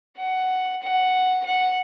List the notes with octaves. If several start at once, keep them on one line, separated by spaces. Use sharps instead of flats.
F#5
F#5
F#5